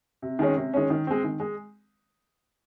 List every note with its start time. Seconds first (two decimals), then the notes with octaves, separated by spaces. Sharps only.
0.22 C3
0.39 D#3 G#3 C#4
0.57 C3
0.74 D#3 G#3 C#4
0.90 D#3
1.07 G#3 C4
1.24 D#3
1.40 G#3